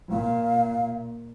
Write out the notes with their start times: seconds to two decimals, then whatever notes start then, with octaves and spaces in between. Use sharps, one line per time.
0.12 A#2 F5